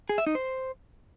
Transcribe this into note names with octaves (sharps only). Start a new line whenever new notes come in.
G#4
E5
D#4
C5